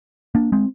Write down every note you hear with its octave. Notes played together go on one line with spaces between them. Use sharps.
A#3 D4
G#3 C4